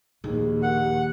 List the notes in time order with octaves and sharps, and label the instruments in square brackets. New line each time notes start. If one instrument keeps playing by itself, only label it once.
[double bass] A#1 D#2 [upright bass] D#3 [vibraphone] D#4 G#4
[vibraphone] G4 A#4 [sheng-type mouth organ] F#5